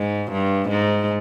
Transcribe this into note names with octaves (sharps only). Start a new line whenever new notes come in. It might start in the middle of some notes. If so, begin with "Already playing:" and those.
Already playing: G#2
G2
G#2